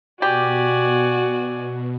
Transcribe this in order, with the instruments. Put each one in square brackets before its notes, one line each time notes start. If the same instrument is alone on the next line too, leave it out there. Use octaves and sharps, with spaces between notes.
[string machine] B2 [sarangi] F#4 [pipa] G4 [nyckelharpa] D5 G#5